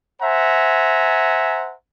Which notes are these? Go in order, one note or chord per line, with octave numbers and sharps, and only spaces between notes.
C5 E5 F#5 G#5 A#5